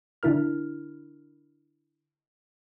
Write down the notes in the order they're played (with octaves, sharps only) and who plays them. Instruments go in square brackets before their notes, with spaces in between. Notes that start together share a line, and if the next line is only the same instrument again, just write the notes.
[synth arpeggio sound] D3 D4 E4 A#4 F6